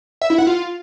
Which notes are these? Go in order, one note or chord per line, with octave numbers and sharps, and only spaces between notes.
E5
E4
F#5
F4